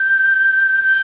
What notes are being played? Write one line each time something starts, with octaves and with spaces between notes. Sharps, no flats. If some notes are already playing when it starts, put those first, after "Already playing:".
Already playing: G6
G6